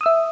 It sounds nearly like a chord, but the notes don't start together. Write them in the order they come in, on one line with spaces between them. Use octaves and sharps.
D#6 E6 E5